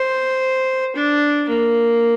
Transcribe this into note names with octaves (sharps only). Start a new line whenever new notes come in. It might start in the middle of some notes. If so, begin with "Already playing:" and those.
Already playing: C5
D4
A#3